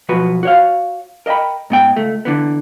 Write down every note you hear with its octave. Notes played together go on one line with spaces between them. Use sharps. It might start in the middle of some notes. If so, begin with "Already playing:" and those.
B1 F3 F#4 B4 B5
F#4 C#5 F5
A#4 D#5 E5 G5 B5
G#2 B3 G5
C#2 A3
D3 E3 B3